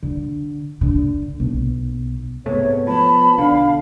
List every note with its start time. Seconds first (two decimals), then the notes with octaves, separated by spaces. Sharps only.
0.03 D3
0.81 D3
1.40 B1
2.46 G#2 C3 A3 B3 C#5
2.87 F3 A5 B5
3.38 B1 D3 D4 F5